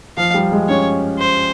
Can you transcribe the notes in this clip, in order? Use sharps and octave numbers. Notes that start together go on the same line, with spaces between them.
F3 F5
G3
G#3
C#4 C#5
C5